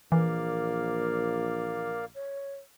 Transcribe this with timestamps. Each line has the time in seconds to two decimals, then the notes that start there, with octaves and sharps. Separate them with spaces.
0.12 A#1 E3 A#3 A#4 D5 F5
2.15 C#5